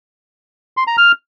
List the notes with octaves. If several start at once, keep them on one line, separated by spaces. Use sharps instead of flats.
C6
A#5
F6